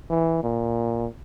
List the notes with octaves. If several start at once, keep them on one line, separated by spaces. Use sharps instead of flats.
E3
A#2